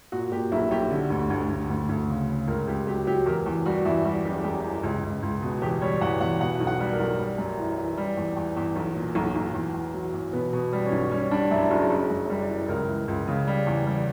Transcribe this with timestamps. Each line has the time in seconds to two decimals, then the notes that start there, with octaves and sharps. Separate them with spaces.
0.12 A#2 F#4
0.32 A#2 G4
0.52 B1 E4
0.71 B1 G4
0.91 D3
1.10 D2
1.30 D2
1.49 D2
1.69 D2
1.89 D2
2.09 C#3
2.28 C#3
2.47 C#2 A#4
2.68 C#2 G4
2.87 F#3 G4
3.07 F#3 G4
3.26 E2 A#4
3.46 E2
3.66 G3 F#4
3.85 E2 E4
4.05 G3 F#4
4.25 F#1 G4
4.44 F#2 G4
4.64 E3
4.83 C#2
5.03 C#2
5.23 C#2
5.42 B2
5.62 E2 G4
5.81 G3 C#5
6.01 E2 F#5
6.21 E2 F#5
6.41 B2 F#5
6.60 B1
6.67 F#5
6.80 G3
6.93 A#4
7.00 B1
7.19 G3
7.38 F#2
7.58 E3
7.78 E3
7.97 G3
8.17 E2
8.37 E2
8.57 E2
8.76 B1
8.96 A#2
9.15 B1
9.35 B1
9.55 E2
9.74 E2
9.94 F#3
10.14 E2
10.33 B2 B3
10.53 B2
10.72 G3
10.86 C#4
10.92 B1
11.11 G3 C#4
11.31 G3 D4
11.51 F#2 E4
11.70 F#1 F#4
11.90 F#1
12.10 F#2
12.29 G3
12.49 E3
12.68 C#2 A#4
12.88 E3
13.08 C#2
13.28 C#3
13.47 G3
13.67 E2
13.86 G3